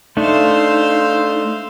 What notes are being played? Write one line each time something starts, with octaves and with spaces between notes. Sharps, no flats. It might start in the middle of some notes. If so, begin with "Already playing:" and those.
A3 D4 D#4 C5 F5 E6